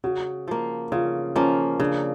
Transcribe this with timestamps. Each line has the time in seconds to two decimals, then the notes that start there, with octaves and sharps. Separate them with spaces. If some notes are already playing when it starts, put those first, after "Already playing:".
0.04 C#3 F#4
0.48 F3 A#3
0.92 C#3 F4
1.36 F3 A#3 C#4
1.80 C#3 D4